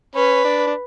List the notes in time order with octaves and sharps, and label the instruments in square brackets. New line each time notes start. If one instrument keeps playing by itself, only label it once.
[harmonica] C#4 [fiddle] B4
[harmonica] D4
D4